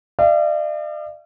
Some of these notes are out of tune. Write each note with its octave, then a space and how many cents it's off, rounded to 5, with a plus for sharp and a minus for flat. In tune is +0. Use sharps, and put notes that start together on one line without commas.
D5 +45 F5 -45